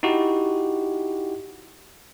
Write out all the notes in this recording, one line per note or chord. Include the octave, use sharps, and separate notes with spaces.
D#4 E4 F#4 G4